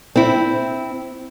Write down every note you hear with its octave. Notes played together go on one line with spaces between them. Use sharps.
C4 E4